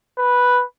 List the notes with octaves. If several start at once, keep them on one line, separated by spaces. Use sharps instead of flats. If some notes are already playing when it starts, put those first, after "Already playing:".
B4